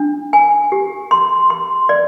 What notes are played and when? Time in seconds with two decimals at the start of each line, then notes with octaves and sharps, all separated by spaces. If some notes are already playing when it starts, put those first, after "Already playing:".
Already playing: D4
0.33 G#5
0.72 G4
1.11 C6
1.50 C6
1.89 D5